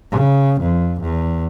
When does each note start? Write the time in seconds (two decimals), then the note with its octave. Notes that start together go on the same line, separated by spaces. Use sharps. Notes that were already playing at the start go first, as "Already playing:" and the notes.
0.12 C#3
0.61 F2
1.01 E2